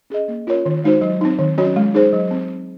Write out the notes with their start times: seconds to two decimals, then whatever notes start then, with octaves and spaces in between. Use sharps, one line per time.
0.10 C#4 G#4 D#5
0.28 A#3
0.47 C#4 F4 A#4 C#5
0.66 D#3
0.84 G#3 D#4 F#4 C5
1.01 F#3
1.21 C4 D#4
1.39 D#3
1.58 F#3 C#4 F#4 C#5
1.76 G#3
1.94 D#4 G#4 C5
2.13 F#3
2.31 C4